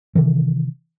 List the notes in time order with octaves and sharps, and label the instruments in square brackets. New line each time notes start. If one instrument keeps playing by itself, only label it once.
[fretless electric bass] C3 D#3 E3